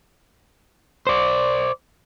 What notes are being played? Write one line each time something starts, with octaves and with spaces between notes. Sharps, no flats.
C5 D5